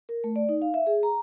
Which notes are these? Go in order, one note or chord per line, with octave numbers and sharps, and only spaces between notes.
A#4
A3
D5
D#4
F5
E5
G#4
A#5